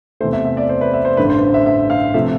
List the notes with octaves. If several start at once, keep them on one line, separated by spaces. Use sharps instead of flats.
E2 C3 E3 A3 C5
E5
E5
D5
C5
B4
E5
C5
A1 G2 D3 B4
C5
E5
E5
F5
C3 F3 A3 E5